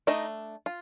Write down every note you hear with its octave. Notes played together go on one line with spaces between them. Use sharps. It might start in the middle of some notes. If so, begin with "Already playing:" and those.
A3 D4 D#4 D#5
F4